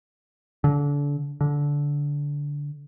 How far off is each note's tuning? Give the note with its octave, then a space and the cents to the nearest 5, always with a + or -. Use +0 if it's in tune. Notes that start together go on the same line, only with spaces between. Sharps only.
D3 -30
D3 -15